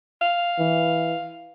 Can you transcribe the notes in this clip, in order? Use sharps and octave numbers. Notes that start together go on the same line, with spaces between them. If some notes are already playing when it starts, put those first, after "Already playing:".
F5
E3